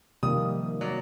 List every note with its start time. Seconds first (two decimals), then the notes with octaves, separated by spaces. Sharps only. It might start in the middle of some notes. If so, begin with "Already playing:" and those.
0.23 C3 D#3 F3 G3 A#3 D#6
0.81 F#3 D5